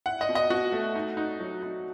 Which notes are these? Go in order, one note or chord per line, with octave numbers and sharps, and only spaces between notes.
E4 F#5
D#5
B2
D#5
B2 F#4
A3
D#4
D#4
F#3
D#4